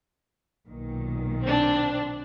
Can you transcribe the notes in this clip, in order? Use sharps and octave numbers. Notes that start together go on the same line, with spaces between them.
B1 A#2 D#3
C4 D4